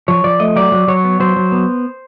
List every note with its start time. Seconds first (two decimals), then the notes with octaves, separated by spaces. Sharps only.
0.08 F3 C#5
0.24 F3 D5
0.40 A3 D#5
0.56 F#3 D5
0.72 F#3
0.88 F#3 C#5
1.04 B3
1.20 F#3 C5
1.36 F#3
1.52 B3